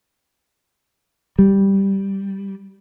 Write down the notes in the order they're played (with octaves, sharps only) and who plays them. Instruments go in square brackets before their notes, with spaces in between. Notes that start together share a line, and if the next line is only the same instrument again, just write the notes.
[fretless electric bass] G3